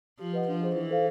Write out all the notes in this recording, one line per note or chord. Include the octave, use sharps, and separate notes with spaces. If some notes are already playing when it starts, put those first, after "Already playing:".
F3 G4
B4 D#5 F#5
F3 D4
F4 G#4 C5
E3 E4
A4 C5 F5